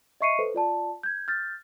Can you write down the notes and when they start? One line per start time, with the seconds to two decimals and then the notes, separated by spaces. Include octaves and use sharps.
0.21 D#5 E5 C#6 C7 C#7 D#7
0.39 A4 B4 C5
0.54 F4 D5 A5
1.03 G6 G#6
1.28 F6 G6 A6